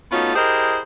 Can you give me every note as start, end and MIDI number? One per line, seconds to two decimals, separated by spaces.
0.12 0.34 57
0.12 0.34 59
0.12 0.34 61
0.12 0.34 63
0.12 0.34 65
0.12 0.34 66
0.36 0.79 64
0.36 0.79 67
0.36 0.79 68
0.36 0.79 70
0.36 0.79 72
0.36 0.79 75